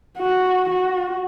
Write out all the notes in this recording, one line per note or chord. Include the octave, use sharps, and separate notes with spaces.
F#4
F#4